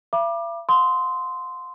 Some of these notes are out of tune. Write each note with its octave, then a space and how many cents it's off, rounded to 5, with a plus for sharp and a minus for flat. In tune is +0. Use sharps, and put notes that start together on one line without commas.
E5 +45 B5 -40 D6 +20
F5 +40 C6 -10 D#6 +30